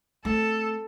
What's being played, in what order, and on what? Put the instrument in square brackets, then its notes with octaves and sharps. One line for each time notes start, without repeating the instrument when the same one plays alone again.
[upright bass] A3 C4 [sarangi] A4